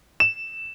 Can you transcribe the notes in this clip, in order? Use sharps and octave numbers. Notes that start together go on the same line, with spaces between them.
E7